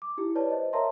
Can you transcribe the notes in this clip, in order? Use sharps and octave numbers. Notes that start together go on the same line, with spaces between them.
D6
D#4 E4 G4
B4 C#5 D5 A5
C5 D#5
A#4 C#5 E5 A5 A#5 C6